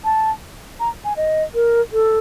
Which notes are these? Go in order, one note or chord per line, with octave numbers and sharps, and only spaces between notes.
A5
A#5
G#5
D#5
A#4
A4